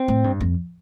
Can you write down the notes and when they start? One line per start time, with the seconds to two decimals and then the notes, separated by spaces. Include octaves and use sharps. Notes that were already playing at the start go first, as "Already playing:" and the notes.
Already playing: C4
0.08 A2
0.24 G2
0.41 F2